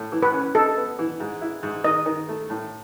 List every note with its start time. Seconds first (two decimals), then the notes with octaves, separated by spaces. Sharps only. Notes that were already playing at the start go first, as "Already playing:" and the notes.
Already playing: A2
0.12 E3
0.23 B4
0.33 C#4
0.55 D#4 A4
0.77 B3
0.99 E3
1.20 G#2
1.41 E4
1.63 G#2
1.84 D#3 D#5
2.06 D#3
2.28 A3
2.50 A2